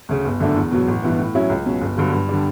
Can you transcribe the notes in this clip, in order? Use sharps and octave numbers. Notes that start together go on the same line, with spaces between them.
D2 C#3
G1
F#2 D3 A3 D4
E2
B2 F#3
A1
G2 E3 B3
A2
F#3 C#4 E4
C#2
B2 F#3 C#4
G1
G2 D3 F#3
G2
D3 G3 D4